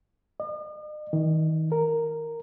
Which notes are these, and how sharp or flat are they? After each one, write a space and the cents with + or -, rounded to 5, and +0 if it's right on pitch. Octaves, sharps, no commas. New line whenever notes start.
D#5 -45
D#3 +30
A#4 -10